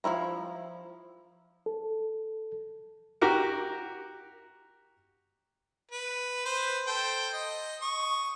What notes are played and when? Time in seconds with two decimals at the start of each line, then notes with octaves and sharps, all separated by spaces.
0.04 F3 F#3 E4 A#5
1.66 A4
3.21 F#4 G4 A#4
5.91 B4
6.45 B4 C5
6.87 A4 C5 G5
7.33 D#5
7.82 C#6 D#6